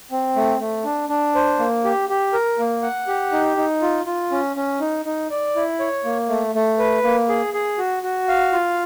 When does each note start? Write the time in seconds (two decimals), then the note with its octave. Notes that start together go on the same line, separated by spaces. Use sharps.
0.11 C4
0.36 A3
0.60 A3
0.84 D4
1.09 D4
1.35 C5
1.59 A#3
1.84 G4
2.09 G4
2.33 A#4
2.59 A#3
2.82 F#5
3.07 G4
3.32 D#4
3.57 D#4
3.82 F4
4.06 F4
4.31 C#4
4.56 C#4
4.80 D#4
5.05 D#4
5.31 D5
5.56 E4
5.80 C#5
6.05 A#3
6.29 A3
6.55 A3
6.79 B4
7.04 A#3
7.29 G#4
7.54 G#4
7.78 F#4
8.03 F#4
8.28 F5
8.52 F4